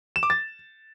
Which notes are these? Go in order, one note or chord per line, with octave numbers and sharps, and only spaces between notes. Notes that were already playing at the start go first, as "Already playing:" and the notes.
E7
D6
A6